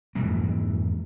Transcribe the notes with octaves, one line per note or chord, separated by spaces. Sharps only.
F2 G#2 E3 A#3